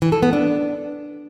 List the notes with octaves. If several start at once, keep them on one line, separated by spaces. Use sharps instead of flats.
E3
A4
B3
D4